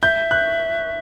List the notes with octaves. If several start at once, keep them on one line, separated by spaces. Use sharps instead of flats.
E5 G6
F#6